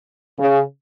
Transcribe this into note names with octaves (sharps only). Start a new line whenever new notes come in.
C#3